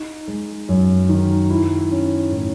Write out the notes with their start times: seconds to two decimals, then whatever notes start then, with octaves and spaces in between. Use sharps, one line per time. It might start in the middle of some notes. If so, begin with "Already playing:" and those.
Already playing: D#4
0.28 G#3
0.69 F#2
1.09 D#3
1.50 E4
1.91 C#4
2.31 A2